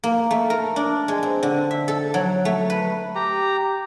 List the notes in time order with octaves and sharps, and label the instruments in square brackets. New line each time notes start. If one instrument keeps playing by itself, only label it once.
[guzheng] A#3
A3
A#4
D4
G#3
C4
D3
E5
A4
F#3
A3
B4
[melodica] G4 A#5